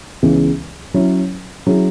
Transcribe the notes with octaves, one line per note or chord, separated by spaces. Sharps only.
C#2 C#3 E3 G#3 B3
F#3 C#4 E4 C#5
F#3 C#4 E4 G#4